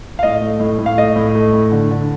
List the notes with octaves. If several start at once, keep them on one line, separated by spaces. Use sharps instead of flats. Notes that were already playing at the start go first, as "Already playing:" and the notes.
F5
A2 D#5
A3
A2
A2
F5
A3 D#5
A2
A3
A2
D3
D3